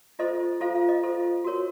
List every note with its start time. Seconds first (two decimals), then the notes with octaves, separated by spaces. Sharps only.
0.19 F4 A4 C5 D#5
0.61 F4 A4 C5 F5
0.75 F5
0.89 D#5
1.03 F4 A4 C5
1.44 F#4 A#4 C#5